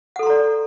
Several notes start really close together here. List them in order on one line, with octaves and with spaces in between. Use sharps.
F#5 A4 C6 A#5 D5